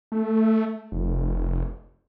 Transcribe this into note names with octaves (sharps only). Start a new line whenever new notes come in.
A3
F1